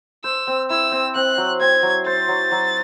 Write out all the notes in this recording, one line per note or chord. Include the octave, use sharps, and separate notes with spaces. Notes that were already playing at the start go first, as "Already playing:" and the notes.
C5 E6
C4
E4 E6
C4
C4 F#6
F#3
C4 G#6
F#3
C5 A6
F#3
F#3